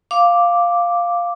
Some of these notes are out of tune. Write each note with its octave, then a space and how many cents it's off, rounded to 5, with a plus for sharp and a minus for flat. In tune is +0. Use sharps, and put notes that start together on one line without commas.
F5 +0 D6 +0